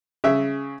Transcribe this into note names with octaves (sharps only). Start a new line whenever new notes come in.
C#3 E5